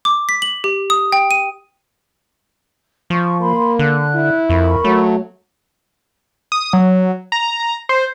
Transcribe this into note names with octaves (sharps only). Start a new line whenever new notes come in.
D6
B6
F#7
G4
D#6
G5
D#7
F3 C#6
A#3 B5 C6
D3 F#6
E4
F2 A#4 B5 C#6
F#3 A3
D#6
F#3
A#5
C5